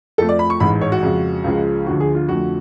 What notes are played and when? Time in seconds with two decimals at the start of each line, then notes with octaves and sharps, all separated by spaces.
0.18 F2 F3 A3 A4
0.29 D5
0.39 B5
0.50 C#6
0.60 A1 G#2 G#3 B5
0.81 C#5
0.92 F#4
1.03 F2 C#3 G#3
1.44 C#2 C#3 F3 G#3
1.86 D2 D3 F3 F#4
2.00 G#4
2.15 F4
2.28 F2 D3 F3 A3 F#4